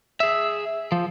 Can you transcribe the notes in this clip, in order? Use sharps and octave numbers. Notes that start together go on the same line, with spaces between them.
G#4 E5
F3